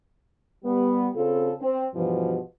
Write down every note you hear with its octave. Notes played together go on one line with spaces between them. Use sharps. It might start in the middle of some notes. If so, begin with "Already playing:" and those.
G3 B3
C#3 C4 F4 A4
C4
G2 B2 E3 F3